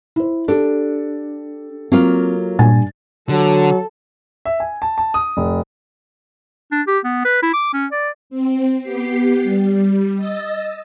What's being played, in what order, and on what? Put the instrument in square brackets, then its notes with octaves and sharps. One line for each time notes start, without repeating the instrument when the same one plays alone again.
[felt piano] E4 C5
[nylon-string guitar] D4 [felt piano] G4 A4
[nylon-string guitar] F#3 A#3 F4 [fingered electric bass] C4
[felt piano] G2 G#5 A6 [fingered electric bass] A#2
[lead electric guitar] D3 [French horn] F#3 [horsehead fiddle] A4
[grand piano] E5
G#5
A5
A5
D#6
F1
[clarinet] D4
G4
B3
B4
E4
D6
C#4
D5
[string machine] C4
B3 G4 C7
G3
D#5 E6 A6